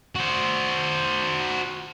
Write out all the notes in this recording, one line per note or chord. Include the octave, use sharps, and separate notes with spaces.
F#4 C5